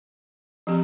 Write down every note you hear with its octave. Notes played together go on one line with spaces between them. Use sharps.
F3 C4 G4